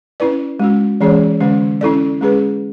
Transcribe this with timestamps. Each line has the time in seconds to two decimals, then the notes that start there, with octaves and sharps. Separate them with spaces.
0.20 C#4 E4 B4 D5
0.60 G#3 C#4 F#4
1.01 E3 G#3 C#4 G#4 C#5
1.40 D3 G#3 C#4
1.81 C#4 E4 A4 D5
2.21 G#3 C#4 G#4 B4